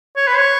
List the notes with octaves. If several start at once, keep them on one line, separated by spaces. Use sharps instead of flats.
C#5
B4
C#5